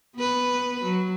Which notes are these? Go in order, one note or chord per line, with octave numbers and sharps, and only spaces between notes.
B3 B4
F#3